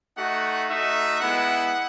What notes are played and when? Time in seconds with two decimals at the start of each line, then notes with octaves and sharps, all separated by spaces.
0.17 A3 D#4 F#4 F#5
0.70 A3 D#4 F#4 E5
1.21 G#3 B3 E4 F#5